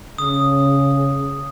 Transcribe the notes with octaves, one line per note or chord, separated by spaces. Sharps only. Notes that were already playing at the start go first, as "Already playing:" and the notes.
C#3 D#6